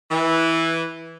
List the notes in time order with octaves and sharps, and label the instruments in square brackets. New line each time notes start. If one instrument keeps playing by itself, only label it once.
[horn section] E3